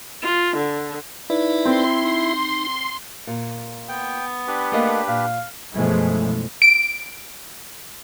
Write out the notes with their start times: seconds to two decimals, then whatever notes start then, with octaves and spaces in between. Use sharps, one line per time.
0.23 F4
0.57 D3
1.30 D#4 E4 B4 D5
1.65 C4 C6
2.03 D#4
3.27 A#2
3.89 B3 G5
4.48 D4 G4 B4
4.72 A3 A#3 D#5
5.08 A#2 F5
5.74 F#2 B2 E3 F3 G#3 A3
6.62 D7